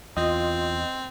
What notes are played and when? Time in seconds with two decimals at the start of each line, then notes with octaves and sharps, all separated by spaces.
0.17 E2 C4 F4 D#5